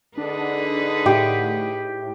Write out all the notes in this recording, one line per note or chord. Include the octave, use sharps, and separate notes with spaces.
D3 D4 D#4 G#4 B4
A2 G4